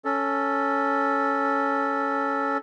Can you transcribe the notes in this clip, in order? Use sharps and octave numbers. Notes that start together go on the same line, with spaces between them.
C#4 A4